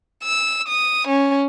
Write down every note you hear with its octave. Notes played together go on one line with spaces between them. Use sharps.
E6
D#6
C#4